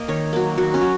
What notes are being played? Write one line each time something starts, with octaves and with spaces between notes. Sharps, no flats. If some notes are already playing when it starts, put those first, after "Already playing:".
Already playing: A#3 D#5 F5
D#3 C#5
F#3 A#3
D#3 F#4
C#4
F#3